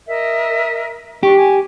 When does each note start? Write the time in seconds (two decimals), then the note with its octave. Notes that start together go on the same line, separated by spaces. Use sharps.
0.07 A#4 D#5 E5
1.23 D4 G4 C#6
1.36 G#5